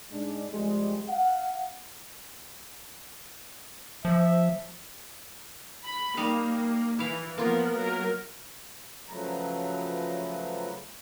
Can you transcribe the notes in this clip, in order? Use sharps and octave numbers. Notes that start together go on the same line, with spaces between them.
G#2 G#3 D4
C2 F3 G3 G#3
F5 F#5
F3 E5
B5
G3 A#3 D#4 F5
E3 E4 F5
F3 A#3 B3 F4 A#4
F#3 A#4
C#3 F3 F#3 A3 B4 A#5